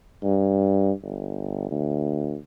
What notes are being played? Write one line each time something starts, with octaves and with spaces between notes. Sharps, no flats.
G2
G1
D2